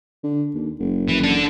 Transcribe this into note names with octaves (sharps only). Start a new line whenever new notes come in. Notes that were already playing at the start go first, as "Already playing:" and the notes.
D3
D#2
F#1
E3
D4 A4